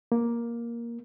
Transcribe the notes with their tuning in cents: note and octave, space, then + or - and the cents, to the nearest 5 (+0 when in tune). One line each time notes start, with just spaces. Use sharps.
A#3 +10